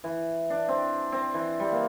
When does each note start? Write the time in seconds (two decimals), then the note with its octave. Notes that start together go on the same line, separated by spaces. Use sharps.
0.04 E3
0.50 D4
0.68 C4
1.12 C4
1.34 E3
1.60 G3
1.72 A#3